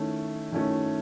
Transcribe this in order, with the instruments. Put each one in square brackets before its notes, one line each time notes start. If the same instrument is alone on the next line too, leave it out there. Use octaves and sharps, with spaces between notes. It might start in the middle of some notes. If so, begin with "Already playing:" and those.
Already playing: [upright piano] D#3 A3 C#4 E4
D#3 A3 C#4 E4